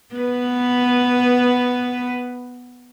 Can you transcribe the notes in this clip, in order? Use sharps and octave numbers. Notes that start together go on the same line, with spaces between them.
B3 B4